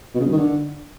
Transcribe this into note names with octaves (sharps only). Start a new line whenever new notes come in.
B2
C#3
G2
D#3
D3